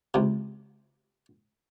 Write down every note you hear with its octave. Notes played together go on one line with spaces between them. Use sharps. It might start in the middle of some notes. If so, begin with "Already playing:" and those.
C#2 C3